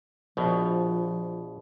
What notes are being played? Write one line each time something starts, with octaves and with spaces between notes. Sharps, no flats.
A#1 B2 F3